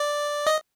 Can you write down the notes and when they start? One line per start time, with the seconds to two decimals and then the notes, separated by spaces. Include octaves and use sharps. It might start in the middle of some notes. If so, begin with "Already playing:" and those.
Already playing: D5
0.47 D#5